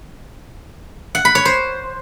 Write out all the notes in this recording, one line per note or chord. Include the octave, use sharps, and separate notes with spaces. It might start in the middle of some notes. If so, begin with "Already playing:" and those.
F#5
B5
C#5
C5